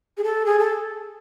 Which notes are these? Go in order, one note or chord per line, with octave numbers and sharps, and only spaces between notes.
G#4
A4
G#4
A4